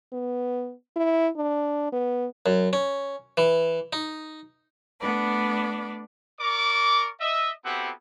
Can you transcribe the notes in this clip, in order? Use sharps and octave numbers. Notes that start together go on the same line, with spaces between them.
B3
E4
D4
B3
F#2
C#4
E3
D#4
A3 B3 D4 B4 D5
A#4 D5 C#6 D6
D#5 E5
B3 C4 E4 F#4 G4 A4